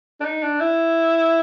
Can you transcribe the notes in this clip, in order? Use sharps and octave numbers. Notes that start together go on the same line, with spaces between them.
D4
D#4
D4
E4